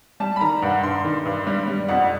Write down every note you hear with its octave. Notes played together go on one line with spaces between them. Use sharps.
G3 A5
B5
D#3 A#5
G2 F#5
G2 C6
D#3
G2
G3
G3
F2 F#5